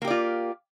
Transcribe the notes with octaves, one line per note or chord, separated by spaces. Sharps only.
A#3 F4 G4 D5